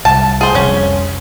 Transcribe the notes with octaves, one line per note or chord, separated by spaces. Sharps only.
C2 A5
G#4 C5
F1 C2 F2 C#4